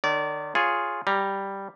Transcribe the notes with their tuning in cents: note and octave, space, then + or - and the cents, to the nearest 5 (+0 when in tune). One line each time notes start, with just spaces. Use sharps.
D#3 -45 D5 -30
F4 +0 G#4 +0 C#5 +0
G3 +0 A#5 +0